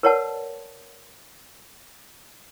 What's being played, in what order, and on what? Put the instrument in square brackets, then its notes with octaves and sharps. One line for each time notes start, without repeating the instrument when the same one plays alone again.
[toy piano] A#4 B4 C#5 D5 F#5 A5